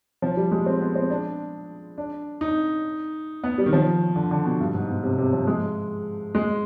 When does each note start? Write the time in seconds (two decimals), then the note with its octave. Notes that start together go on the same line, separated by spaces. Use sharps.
0.22 F3
0.37 G3
0.52 G#3
0.66 C4
0.81 B3
0.96 C4
1.10 D4
1.98 D4
2.41 D#4
3.44 B3
3.58 G3
3.66 D#3
3.73 F3
4.16 D3
4.31 D3
4.45 B2
4.60 G2
4.74 G#2
4.89 B2
5.03 C3
5.18 C3
5.33 F3
5.47 G#3
6.35 G#3